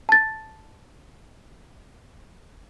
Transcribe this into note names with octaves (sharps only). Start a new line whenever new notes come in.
A5 A6